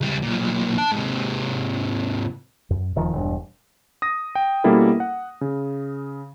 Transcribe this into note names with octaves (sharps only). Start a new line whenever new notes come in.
C#2 G3
B1 A#2
D4 A5
G#2 C3
F#2
E1 D#3 F3
E1 G2
D#6 A#6
G5
B2 G3 A#3 C#4 E4 A4
F#5
C#3